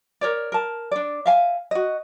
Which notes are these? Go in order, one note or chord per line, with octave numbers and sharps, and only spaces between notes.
A#4 C#5 D5
A#4 A5
D4 D5
E5 F5 G#5
F#4 D#5